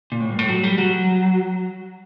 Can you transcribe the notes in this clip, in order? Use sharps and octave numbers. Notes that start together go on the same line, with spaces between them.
A#2
A2
G2
A2
F#3
G3
F#3